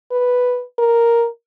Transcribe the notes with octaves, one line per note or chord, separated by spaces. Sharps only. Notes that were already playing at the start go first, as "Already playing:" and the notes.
B4
A#4